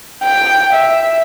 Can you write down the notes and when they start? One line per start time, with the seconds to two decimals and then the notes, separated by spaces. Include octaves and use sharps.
0.24 G5
0.73 E5